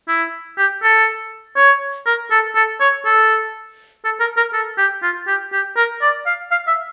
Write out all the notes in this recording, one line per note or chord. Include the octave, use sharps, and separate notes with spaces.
E4
G4
A4
C#5
A#4
A4
A4
C#5
A4
A4
A#4
A#4
A4
G4
F4
G4
G4
A#4
D5
F5
F5
E5